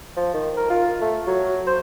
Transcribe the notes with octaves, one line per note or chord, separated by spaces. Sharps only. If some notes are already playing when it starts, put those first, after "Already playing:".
F3
D#3
A#4
F4
A3
F#3
C5